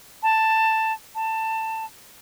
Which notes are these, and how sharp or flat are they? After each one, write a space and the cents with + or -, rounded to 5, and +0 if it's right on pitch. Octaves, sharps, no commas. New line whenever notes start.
A5 +10
A5 +15